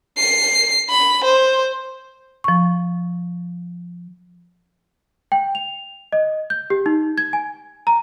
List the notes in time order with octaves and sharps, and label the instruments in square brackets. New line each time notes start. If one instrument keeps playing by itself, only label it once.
[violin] C7
B5
C5
[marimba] F3 C#6
[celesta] G5
F7
D#5
G6
G4
D#4
G#6
G#5
A#5